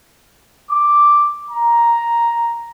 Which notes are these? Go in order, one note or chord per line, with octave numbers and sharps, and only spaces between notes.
D6
A#5